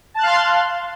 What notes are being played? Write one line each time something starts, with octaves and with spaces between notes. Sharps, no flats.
F5 A5 C6 F#6